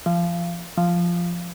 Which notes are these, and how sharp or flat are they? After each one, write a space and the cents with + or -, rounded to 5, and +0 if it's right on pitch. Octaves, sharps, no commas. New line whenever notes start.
F3 -25
F3 -5